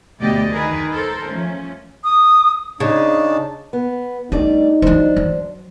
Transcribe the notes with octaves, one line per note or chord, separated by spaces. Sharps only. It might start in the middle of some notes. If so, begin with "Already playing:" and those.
D2 B2 A3 G4 D5 D#5
D#3 G#4 A#4 B4
A4 A#4 C5
F3 A3 C#4
D#6
C#3 D4 D#4 A5
B3
G3 A3 D4 D#4 D5
E3 F#3 D4 C5
F#3